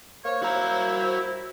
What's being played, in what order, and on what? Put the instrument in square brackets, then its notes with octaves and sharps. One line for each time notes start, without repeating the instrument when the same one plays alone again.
[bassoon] A#3 [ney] C5 [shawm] C#5
[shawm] E4 [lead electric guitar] F#4 A#5